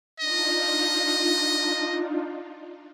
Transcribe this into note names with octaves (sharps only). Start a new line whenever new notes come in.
D4 D#4 F4 D#5